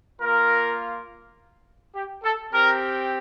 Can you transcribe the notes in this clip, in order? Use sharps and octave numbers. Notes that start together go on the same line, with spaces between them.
A#3 F4 A#4
G4
A4
C4 G4 A#4